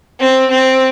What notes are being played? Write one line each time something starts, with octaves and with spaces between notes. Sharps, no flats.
C4
C4